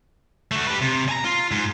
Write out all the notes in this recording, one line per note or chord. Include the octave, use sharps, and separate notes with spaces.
A3 F#4
G4 B4
C3
G#5 A#5
F4
G#2